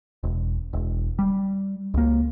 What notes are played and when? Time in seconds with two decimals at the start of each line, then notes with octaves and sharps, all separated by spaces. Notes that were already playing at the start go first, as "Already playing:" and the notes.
0.23 E1
0.73 E1
1.19 G3
1.94 C#2 A#3